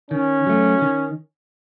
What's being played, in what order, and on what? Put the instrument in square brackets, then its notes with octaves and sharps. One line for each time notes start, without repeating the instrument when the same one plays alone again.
[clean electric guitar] D#3 [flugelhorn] C#4
[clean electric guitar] F#3 A3
D#3